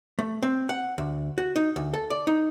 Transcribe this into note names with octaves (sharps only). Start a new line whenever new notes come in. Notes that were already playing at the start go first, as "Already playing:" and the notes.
A3
C4
F#5
D2
F#4
D#4
D2
A4
D5
D#4